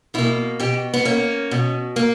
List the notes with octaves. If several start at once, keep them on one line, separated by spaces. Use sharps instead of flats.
B2 A#3 E4
B2 G4
B3
A#3 C#4
B2
A#3